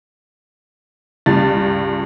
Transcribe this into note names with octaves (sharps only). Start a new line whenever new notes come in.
C#2 G2 A6